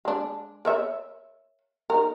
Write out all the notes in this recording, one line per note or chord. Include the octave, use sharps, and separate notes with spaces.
G#3 D4
A#4 C#5 E5
D#4 A#4